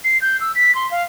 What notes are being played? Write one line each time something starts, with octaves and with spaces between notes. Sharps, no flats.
C7
G6
E6
B6
C6
F5